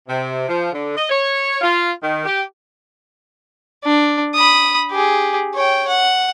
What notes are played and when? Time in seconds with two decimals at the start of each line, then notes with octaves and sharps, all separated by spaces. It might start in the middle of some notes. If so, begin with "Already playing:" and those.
0.08 C3
0.48 F3
0.72 D3
0.96 D#5
1.09 C#5
1.61 F4
2.02 D#3
2.25 G4
3.84 D4
4.34 B5 D#6
4.91 G4 G#4
5.54 C#5 G5
5.88 F#5